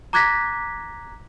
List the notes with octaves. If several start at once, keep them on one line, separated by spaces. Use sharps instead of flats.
A#5 D6 F#6 G#6 A#6 B6